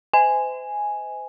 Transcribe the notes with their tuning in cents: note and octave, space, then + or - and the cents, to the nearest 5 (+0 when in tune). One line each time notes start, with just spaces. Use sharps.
C5 -40 D#5 +45 G#5 +0